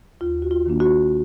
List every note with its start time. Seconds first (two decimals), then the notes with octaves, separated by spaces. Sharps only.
0.21 D#2 F4
0.42 F#4
0.51 F4
0.66 D#3 A#3 D4
0.80 F#4